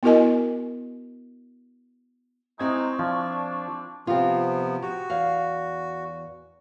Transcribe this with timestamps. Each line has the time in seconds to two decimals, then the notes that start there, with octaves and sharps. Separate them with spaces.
0.03 B3 E4 F#4 A#4 D#5 G#5
2.59 G#3 C4 D#4 E4 C#6 G#6
2.99 F3 D4
4.07 C3 F3 B3 C4 F4
4.82 F#4 G4
5.10 E2 F5